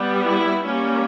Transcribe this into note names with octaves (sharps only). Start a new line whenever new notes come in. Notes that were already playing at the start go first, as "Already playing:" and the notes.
Already playing: G3 B3
E4
G3 A#3 C#4